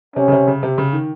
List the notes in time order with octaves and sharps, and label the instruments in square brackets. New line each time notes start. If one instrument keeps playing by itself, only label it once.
[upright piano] C3 [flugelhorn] C#4
[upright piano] C#3
C3
C#3
C3
C#3
D#3